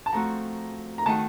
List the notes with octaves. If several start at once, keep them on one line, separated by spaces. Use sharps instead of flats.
A5
F3 A3 C4 F#4 A#5
A#5
D#3 A3 D#4 F#4 A5